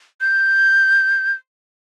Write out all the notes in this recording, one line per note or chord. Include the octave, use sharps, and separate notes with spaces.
G6